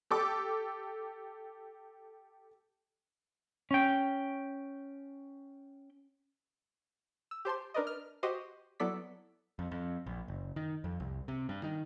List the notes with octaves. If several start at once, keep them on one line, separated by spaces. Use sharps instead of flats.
G4 A4 D6
C#4 G5
E6
G4 C5 A5 C6
D4 A#4 B4 D5 D#5
F6
F#4 G4 C5 D#5
F#3 B3 E4 A4 D5 B6
F2
F2
A#1
F#1
D#3
F2
C2
C3
G2
D#3